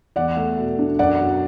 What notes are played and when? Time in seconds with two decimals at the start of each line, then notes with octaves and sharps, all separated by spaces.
0.16 E2 D5 F#5
0.36 A3
0.58 B2
0.79 D4
0.99 F#2 D5 F#5
1.20 F#3